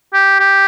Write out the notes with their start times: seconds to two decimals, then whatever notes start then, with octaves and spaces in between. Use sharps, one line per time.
0.13 G4
0.40 G4